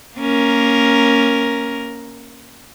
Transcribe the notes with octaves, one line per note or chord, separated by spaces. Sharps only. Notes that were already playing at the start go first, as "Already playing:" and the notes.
A#3 C#4 A#4